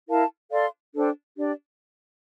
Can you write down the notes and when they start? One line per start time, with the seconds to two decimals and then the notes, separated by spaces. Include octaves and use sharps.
0.08 E4 A#4 F5 A5
0.51 A4 D5 F5 C6
0.94 D4 A4 C5 G5
1.37 D4 G4 D5